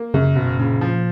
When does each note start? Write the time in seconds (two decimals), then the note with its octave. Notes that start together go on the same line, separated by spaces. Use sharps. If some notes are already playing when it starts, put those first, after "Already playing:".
Already playing: A#3
0.14 F#2 C#3
0.36 F#1 B2
0.58 A#2 C#3
0.81 F3